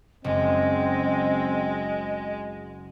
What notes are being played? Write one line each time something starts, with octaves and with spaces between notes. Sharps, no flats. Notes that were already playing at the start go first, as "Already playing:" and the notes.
F#1 G#3 C4 D#5